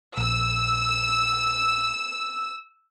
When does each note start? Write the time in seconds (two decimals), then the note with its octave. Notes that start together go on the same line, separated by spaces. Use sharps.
0.17 A#1 E6